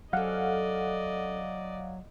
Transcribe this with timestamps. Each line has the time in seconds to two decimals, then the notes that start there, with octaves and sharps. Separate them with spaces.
0.13 F#3 C#4 A4 D5 D#5 F5 F#5